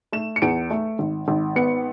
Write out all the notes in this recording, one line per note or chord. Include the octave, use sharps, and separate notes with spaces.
A3 E7
C#7
E2 D7
A3
G#1
G#1
B3 C#7